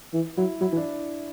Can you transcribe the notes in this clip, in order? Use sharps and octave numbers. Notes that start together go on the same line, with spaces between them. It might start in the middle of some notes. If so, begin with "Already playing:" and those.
E3
F#3 E4
F#3 E4
E3
D4